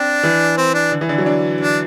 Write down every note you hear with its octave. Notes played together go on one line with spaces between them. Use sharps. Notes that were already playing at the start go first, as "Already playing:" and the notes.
Already playing: C4 D4
E3
C4
D4
D3
E3
D3
F#3
D4
D4